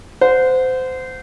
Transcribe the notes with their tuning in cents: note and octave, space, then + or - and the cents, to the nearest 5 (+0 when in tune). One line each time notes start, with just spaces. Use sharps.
C5 -25 F#5 -25